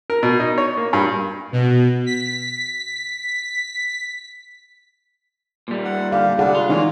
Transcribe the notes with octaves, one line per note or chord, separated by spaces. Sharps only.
A#4
B2
D#4
C#5
A#3
G2
B2
B6
A#2 G3
F#5
D3 G4 F5
C2 D3 G3 D4 G#4 F#5
F4
E3 G#3 A#3 C#4 D#4 D5